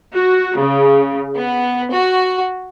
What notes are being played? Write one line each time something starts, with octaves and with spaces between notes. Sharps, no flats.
F#4
C#3
B3
F#4